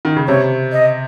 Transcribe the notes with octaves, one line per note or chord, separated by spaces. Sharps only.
D#3
C#3
C3 C#5
D#5